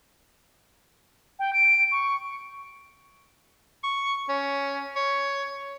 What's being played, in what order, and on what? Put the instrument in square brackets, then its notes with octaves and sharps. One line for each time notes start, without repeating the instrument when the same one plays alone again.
[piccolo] G5
D7
C#6
[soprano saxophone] C#6
C#4
C#5